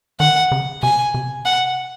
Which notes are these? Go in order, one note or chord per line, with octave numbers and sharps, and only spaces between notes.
D#3 F#5
C#3
C3 G#5
C3
F#5